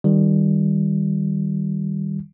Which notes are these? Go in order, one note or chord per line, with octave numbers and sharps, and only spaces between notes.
D#3 G3